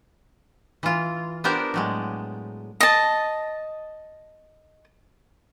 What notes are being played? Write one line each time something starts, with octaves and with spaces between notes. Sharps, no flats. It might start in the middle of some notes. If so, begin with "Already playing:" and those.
E3 F4
B3 D4 G4 A#4 C5 D5
A2 F#3 G#3
D#5 A5